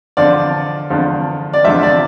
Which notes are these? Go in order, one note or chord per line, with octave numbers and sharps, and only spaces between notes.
E2 D3 F3 D5
E2 D3 F3
D5
E2 D3 F3 E5
D5